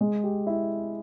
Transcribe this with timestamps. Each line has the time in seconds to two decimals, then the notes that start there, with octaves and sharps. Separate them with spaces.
0.01 G#3
0.24 G4
0.47 E4